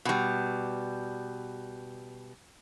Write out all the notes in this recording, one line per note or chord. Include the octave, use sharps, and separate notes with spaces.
B2 G3